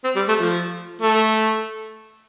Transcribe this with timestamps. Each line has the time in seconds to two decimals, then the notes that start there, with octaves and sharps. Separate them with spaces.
0.04 C4
0.16 G3
0.28 A3
0.40 F3
1.02 A3